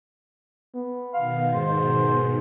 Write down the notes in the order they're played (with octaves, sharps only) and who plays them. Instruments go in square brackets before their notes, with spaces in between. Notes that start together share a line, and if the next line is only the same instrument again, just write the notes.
[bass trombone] B3
[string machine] B2 D#3 [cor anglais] F5
[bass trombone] G#2 [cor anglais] C5